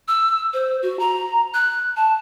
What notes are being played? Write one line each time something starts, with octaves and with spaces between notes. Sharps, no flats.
E6
C5
F#4
A#5
F#6
A5